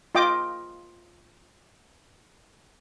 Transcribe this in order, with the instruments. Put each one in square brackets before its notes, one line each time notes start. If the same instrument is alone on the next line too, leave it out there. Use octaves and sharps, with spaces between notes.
[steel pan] F4 D#5 G5 D6